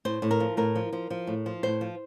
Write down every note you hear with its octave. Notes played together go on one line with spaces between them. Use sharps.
A2 C5
A2
A#4
F3
A2 A#4
F3
F3
F3
A2
F3
A2 C5
F3